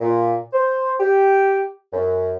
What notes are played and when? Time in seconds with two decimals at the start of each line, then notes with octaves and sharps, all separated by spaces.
0.01 A#2
0.53 C5
1.00 G4
1.93 F#2